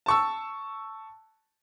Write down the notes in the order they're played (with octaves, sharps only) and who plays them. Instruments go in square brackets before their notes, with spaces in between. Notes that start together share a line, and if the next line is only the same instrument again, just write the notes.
[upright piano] A5 C#6 E6